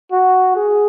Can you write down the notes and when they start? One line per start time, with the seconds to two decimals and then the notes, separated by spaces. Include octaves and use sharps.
0.12 F#4
0.56 G#4